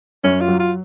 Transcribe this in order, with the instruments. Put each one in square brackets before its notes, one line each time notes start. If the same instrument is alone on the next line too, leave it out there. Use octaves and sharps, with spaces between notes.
[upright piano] F#2 [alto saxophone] C#4
[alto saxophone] F4
[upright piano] F#3
[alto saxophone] F4